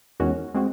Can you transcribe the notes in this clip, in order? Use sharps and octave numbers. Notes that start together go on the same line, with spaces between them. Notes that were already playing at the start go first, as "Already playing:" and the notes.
E2 D#3 G#3 C#4 F#4
G#3 C4 F#4